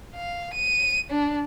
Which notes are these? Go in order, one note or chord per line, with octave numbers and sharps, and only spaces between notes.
F5
D#7
D4